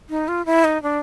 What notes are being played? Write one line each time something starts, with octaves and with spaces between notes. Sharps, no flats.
D#4
F4
E4
D#4
D4